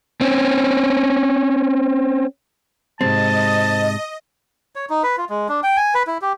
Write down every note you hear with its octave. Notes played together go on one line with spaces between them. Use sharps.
C4 C#4
G#2 C3 G#3 C4 D#5 A5
C#5
D#4
B4
F4
G#3
D4
G5
G#5
B4
E4
G4